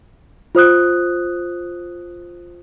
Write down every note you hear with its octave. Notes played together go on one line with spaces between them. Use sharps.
F4 C5 D#6 F#6